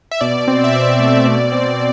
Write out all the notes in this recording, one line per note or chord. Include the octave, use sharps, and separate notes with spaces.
E5
B2 D5
C4
E5
B2 D5
A3
B2
C4